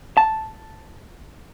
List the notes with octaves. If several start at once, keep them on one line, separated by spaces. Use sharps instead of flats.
A5